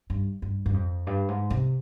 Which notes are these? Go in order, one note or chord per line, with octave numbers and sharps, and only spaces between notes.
G2
G2
G2
F2
G2
G#2
C3